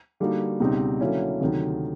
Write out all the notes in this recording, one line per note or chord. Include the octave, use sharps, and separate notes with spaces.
D3 G3 A#3 D#4 F#4
C#2 B2 G3 C4 D#4
D3 F#3 A#3 C#4 E4
D2 C3 D#3 F#3